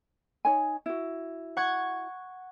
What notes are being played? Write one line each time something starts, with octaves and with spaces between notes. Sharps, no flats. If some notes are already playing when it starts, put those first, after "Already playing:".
D#4 C#5 G#5
E4 F#4
F#5 C#6 G#6